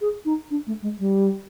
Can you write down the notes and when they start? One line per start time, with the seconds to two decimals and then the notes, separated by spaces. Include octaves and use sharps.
0.01 G#4
0.25 D#4
0.51 D4
0.67 A3
0.82 G#3
0.99 G3